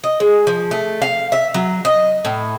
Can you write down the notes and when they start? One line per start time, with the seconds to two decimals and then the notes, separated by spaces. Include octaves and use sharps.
0.04 D#5
0.20 G#3
0.47 F3
0.71 A3
1.02 F5
1.32 E5
1.54 F#3
1.85 D#5
2.25 A2